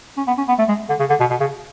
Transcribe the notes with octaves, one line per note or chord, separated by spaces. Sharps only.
C#4
B3
C#4
B3
A3
G#3
D3
C#3
D3
B2
B2
C#3